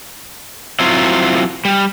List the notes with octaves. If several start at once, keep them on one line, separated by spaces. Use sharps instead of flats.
F#3 C4 E4 F4
G3